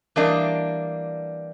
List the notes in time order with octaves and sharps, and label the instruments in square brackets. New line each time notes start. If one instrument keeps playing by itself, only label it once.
[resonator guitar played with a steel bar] E3 G3 A#3 D4 D#5